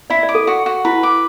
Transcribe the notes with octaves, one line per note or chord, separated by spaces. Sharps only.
E4 D5
D5
D6
A4
F#4
F#4
E4 B4
D6